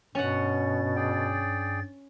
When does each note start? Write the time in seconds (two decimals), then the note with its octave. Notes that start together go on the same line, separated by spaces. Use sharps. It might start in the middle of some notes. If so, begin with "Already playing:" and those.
0.15 G2 B2 C#4 F#5 A6
0.96 G#4 D5 G5